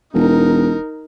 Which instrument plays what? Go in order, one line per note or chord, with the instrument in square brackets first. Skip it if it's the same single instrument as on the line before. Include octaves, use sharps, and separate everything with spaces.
[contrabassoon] E1 [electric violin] D#4 A#4